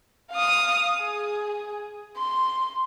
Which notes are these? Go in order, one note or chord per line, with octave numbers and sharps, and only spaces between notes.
F5 D#6
G#4
C6